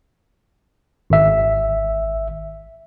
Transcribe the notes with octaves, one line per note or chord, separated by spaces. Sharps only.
G#1 E5